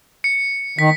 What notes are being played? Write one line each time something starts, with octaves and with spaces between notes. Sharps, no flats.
C#7
D#3 B6